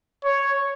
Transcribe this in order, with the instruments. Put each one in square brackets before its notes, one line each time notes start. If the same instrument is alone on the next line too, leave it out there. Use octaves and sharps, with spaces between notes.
[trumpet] C#5